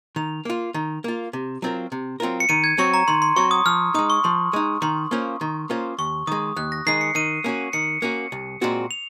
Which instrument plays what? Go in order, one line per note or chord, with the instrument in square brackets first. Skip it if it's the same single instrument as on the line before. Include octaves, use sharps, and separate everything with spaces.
[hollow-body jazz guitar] D#3 [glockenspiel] F7
[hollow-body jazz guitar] A#3 F4
D#3
A#3 F4
C3
F#3 C4 F4 A#4
C3
F#3 C4 F4 A#4
[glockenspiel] C#7
[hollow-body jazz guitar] D#3 [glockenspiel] D#7
[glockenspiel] G#6
[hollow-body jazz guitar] F#3 C4 F#4 C#5 [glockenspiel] C#6
[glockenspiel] A#5
[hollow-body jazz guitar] D#3 [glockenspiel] C6
[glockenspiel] C6
[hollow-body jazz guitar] F#3 C4 F#4 C#5 [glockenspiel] C#6
[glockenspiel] D#6
[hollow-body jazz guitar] F3 [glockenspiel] F6
[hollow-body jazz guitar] D#4 [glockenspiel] D#6
[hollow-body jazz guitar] G#3
[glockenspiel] C#6
[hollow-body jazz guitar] F3 [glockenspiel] C6
[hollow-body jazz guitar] G#3 D#4
[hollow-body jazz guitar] D#3 [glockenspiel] C6
[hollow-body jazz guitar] A#3 C#4 F4 C5
D#3
A#3 C#4 F4 C5
[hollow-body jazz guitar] D#2 [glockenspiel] C#6
[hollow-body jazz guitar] D#3 [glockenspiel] D#6
[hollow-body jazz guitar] G#3
[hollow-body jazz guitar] D#2 [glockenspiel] F#6
[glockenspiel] A#6
[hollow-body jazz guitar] D#3 G#3 [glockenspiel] C7
[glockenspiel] C#7
[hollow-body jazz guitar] D#3 [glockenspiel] D#7
[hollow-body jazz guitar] A#3 C#4 F#4
[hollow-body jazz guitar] D#3 [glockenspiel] C#7
[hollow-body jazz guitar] A#3 C#4 F#4
C2
A#2 G#3 C4 F#4
[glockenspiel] F7